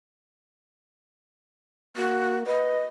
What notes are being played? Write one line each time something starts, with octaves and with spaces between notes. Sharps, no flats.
A#3 F#4
B4 D#5